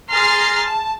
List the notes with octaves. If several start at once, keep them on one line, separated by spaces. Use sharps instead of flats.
G#4 A#5 C6 F6 A6 C7
A5